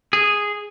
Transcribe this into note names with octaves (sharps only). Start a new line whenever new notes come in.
G#4